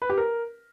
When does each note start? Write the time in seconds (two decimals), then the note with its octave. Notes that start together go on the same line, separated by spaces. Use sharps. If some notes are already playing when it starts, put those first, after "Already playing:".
0.02 B4
0.10 G4
0.18 A#4